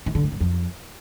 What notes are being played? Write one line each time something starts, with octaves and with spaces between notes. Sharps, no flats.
D#3
D3
G#2
F#2
F2